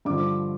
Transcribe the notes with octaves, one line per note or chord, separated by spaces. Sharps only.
G2 D3 F3 D6